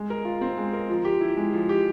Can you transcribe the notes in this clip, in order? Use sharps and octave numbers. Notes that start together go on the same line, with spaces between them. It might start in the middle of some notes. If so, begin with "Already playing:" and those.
Already playing: G#3
A#4
F4
C4
G#3
A#4
F3
G4
E4
G#3
F3
G4